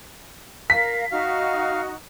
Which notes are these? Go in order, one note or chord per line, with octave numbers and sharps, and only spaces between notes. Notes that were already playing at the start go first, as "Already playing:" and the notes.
A#4 F5 B6
D#4 F#4 F5